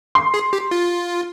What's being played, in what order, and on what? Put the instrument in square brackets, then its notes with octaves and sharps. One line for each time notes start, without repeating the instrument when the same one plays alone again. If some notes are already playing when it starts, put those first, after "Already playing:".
[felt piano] C6
[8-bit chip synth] G#4
G4
F4